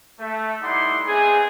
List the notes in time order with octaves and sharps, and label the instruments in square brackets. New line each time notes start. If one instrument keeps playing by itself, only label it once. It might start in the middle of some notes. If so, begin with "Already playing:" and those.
[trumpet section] A3
G3 D#4 E4 D5 F#5 C6
G#3 B3 C4 G#4